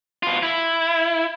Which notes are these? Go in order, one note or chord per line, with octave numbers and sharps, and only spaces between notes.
B2 F4
E4